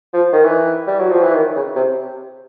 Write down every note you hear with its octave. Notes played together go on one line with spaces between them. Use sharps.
F3
D#3
E3
G3
F#3
F3
E3
D#3
C#3
C3